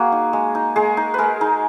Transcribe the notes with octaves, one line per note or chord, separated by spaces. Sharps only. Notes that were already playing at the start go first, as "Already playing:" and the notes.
Already playing: A#3 F#4 G#4
D#4
G#3
D#4
G#3 G#4
D#4
G#3 A#4 B4
D#4